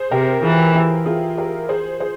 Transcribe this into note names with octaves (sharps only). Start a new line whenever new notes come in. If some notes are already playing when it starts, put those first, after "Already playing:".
Already playing: G#4 C5
C3 G4 A#4
E3 F4 G#4
E4 G4
F4 G#4
G4 A#4
G#4 C5
G#4 C5